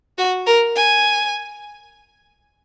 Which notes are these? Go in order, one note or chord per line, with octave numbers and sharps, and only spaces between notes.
F#4
A#4
G#5